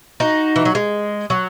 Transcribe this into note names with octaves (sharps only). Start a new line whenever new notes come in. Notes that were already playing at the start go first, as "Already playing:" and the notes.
D#4 F#4
E3
F#3
G#3
F#3